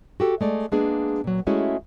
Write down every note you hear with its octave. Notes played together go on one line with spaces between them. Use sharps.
F#4 G4 A4
G#3 A3 D5
G#3 A#3 B3 D4 G#4
A#2 F#3
G#3 A3 C#4 E4 F#4 G#4